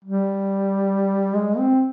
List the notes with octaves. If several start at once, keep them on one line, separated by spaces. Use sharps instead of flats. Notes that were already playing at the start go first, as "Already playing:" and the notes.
G3
G#3
C4